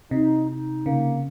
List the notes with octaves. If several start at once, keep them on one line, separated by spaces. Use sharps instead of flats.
C3 D#4
D#4
C#3 A#3